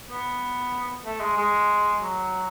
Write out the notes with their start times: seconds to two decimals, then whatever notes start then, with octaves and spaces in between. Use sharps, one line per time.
0.10 B3
1.05 A3
1.21 G#3
1.37 G#3
2.01 F#3